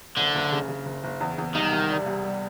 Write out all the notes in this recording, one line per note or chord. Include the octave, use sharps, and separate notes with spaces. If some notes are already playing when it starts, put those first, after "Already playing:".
F#1 D3
F#1
C#3
C#3
F#1
F#1
E2
E2
C2 D#3
C2
G3
C2
G3